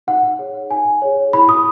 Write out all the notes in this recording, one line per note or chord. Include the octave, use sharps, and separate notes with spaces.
D#4 F#5
G#4 C#5
D#4 G#5
G#4 C#5
E4 B5
D#6